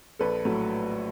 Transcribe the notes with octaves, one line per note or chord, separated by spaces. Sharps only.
A#1 A4 B4
A2 F#3